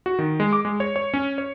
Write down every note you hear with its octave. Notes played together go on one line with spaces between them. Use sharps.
F#4
D#3
G#3
D6
G#3
C#5
C#5
C#4
C#5